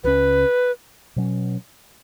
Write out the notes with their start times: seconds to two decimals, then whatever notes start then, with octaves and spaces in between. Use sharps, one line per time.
0.04 C#2 C#3 F#3 C#4 B4
1.16 B2 F#3 C#4